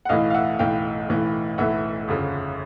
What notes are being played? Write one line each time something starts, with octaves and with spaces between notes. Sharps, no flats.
F#5
B1 A2 E3 D#5 F5
F5
E5 F#5
B1 A2 E3 F5 G5
B1 A2 E3
B1 A2 E3 E5 F#5
G1 F2 C#3